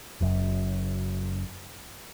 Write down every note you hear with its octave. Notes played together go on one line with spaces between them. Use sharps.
F#1 F#2